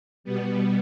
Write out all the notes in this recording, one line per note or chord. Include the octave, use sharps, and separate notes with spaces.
B2 G3 B3